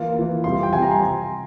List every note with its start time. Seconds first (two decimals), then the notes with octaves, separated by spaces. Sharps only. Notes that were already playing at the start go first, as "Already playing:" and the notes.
Already playing: E3 A#3 F4
0.16 E3 A#3 F4
0.44 C3 G3 C4 F4 C6
0.63 G5
0.73 C3 G3 C4 F4 G#5
0.82 A#5
0.91 C6